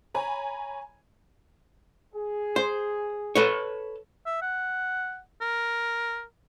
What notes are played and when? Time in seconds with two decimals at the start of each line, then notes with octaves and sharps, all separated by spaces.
0.15 C#5 G#5 A#5 B5
2.15 G#4
2.56 C5
3.35 A4 B4 C#5
4.26 E5
4.42 F#5
5.41 A#4